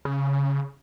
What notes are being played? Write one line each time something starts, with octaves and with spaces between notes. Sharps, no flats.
C#3